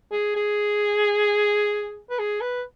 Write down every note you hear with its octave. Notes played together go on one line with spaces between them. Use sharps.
G#4
G#4
B4
G#4
B4